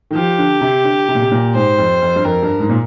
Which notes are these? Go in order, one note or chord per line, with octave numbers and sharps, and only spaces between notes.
D#3
F3 G4
D3
C3
D3
C3
A#2
C3
A#2
G#2 C5
F2
F2
G2
F2 A#4
G2
G#2
A#2